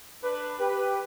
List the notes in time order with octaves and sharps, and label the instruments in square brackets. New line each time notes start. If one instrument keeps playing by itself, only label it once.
[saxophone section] D4 B4
[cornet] G4 [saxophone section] B4